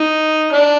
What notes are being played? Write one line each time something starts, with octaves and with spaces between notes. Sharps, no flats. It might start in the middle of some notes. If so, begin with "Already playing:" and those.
Already playing: D#4
D4